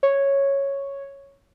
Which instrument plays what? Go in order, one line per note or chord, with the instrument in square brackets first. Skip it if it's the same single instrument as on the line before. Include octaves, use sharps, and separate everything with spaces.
[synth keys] C#5